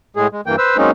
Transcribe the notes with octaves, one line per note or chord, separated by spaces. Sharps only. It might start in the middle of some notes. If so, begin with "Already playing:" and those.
A2 G#3 G#4
G#3
G2 E3 A#3 G5
B4 C5 E6
F#3 G#3 A#3 C4 C#4 D#4